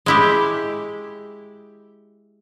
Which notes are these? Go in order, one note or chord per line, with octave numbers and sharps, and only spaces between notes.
G#3 E4 G4